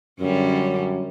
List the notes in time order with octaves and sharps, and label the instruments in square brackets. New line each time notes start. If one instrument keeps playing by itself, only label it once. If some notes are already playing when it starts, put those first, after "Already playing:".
[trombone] F#2 [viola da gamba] D3 G3 C#4